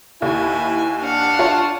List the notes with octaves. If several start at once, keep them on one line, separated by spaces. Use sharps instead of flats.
D#2 E4 G#5
D4 F5 F#5
F4 C#5 A5